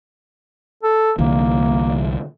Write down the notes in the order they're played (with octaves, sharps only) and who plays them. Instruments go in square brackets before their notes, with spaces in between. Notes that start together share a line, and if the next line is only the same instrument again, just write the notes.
[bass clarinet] A4
[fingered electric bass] C2 D3 E3 [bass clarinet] A#3